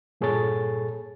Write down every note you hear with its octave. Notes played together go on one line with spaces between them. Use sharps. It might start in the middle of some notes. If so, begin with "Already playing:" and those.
G2 A#2 G#4 A4 C#5 A6